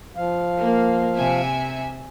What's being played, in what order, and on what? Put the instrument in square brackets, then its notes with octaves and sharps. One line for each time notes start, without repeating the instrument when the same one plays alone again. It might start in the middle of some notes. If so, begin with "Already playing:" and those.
[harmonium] F3 F5
[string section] A#3
C3 E5 G#5